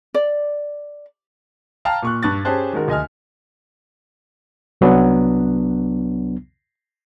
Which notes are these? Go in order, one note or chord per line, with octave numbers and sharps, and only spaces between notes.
D5
F5 G5 A5 A#5 F6
A#2 C#6 F#6
G2 C#6 F#6 A6
C#4 G4 G#4 C5 A5 F#6
D#3 G#3 F#4 A#4
D2 D#5 G#5 F6
C2 F#3 B3 D4